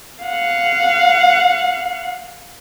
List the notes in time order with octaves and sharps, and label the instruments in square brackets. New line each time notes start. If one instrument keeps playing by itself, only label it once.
[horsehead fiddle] F5 F#5